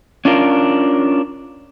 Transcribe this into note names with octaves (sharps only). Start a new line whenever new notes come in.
C#4 D4 F4 A#4